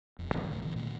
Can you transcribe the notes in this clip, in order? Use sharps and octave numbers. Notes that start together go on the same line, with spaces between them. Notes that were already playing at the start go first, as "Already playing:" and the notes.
E1 F2
G#2 D#3 F#3 G#3
G1 D#2 A2 C#3
B2 D3 E3
A#2 D#3 A3